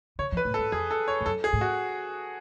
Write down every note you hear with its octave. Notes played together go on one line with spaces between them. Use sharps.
D3 C#5
F3
B4
A2
A4
G#2
F2 G#4
A4
C#5
G#2
F#2 A4
G#4
A2
F#4